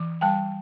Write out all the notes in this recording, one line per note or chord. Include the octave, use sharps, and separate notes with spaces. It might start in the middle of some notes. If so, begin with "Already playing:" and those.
Already playing: E3
G3 G5 A5